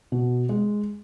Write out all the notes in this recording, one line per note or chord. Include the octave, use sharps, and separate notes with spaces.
B2
G#3